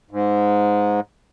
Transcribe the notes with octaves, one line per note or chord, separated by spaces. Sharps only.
G#2